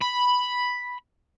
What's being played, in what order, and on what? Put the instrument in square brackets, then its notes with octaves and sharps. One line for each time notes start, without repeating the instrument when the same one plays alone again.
[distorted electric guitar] B5